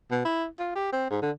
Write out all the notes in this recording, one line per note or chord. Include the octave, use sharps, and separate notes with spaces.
B2
E4
F4
G4
C4
G#2
D3